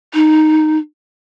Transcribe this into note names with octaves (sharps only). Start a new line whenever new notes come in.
D#4